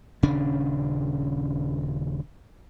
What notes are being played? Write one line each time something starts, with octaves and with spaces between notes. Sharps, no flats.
D#1 C#3 C#4 D4